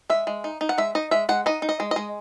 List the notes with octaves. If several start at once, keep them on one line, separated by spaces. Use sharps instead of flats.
G#3 E5
G#3
D#4
D#4
F#5
G#3 E5
D#4 D#5
G#3 E5
G#3 F#5
D#4 D#5
D#4
D#5
G#3
G#3 D#5